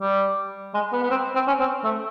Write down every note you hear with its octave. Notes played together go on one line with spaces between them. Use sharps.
G3
G#3
B3
B3
C4
C4
C#4
C4
A3